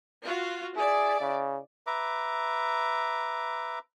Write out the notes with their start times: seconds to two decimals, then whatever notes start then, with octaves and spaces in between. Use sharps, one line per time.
0.24 F4 F#4
0.76 E4 G#4 D5
1.20 C#3
1.87 B4 E5 A#5 D6